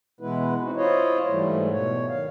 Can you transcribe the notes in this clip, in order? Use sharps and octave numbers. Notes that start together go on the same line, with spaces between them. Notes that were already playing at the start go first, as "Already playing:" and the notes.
B2 E3 G#3 B3 E4 B4
C4 D#4 F#4
E4 F4 C5 C#5 D#5
G#2 E3 F#3 G3 A3
B2 C#5
D#3 F5